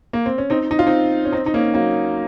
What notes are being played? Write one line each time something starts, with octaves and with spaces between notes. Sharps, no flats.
A#3
C4
C#4
C4 D#4
D#4
F4
C4 D#4
C#4
C4 D#4
D#4
A#3 C#4
F#3 A#3